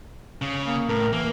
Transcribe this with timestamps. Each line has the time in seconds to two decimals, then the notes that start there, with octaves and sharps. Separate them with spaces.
0.42 C#3
0.67 A#3
0.89 A2 A#4
1.13 E3 A#3